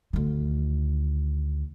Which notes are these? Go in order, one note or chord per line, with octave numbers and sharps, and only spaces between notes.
D2 D#3